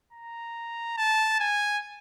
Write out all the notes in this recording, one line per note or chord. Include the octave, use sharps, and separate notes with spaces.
A#5
A5
G#5